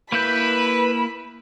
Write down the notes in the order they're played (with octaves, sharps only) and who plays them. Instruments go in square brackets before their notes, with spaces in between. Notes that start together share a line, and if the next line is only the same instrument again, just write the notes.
[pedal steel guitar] A#3 E4 G6 [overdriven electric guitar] B4 [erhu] B5